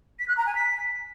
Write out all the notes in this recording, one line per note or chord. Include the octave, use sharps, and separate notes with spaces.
B6
F#6
A#5
G#5
B6